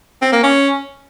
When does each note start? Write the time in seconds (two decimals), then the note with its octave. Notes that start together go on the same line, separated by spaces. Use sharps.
0.22 C4
0.32 A#3
0.43 C#4